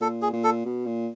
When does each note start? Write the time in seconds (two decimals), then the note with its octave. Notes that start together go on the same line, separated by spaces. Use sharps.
0.01 A#2 A4
0.22 G#4
0.33 A#2
0.44 A4
0.65 B2
0.86 A#2